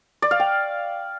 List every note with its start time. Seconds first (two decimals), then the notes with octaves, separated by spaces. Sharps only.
0.22 D5
0.31 F5
0.40 G5